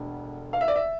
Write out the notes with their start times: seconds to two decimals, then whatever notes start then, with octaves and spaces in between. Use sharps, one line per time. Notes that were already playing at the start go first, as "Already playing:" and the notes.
Already playing: E1 D2 D3
0.53 F5
0.61 E5
0.68 D5
0.76 E5